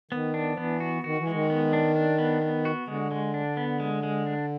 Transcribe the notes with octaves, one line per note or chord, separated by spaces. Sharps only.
D#3 B3
D4
F3
E3 B3
F#4
D#3 F#4
E3
D#3 G#3
B3
D4
D4
B3
B3
F#4
D3 G#3
G#3
D4
B3
G#3
G#3
D4